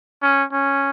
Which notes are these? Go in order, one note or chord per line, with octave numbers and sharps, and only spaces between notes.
C#4
C#4